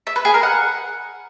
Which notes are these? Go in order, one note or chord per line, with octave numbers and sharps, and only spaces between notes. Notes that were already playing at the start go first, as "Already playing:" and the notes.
E5
B4
G#4
A#4
F#5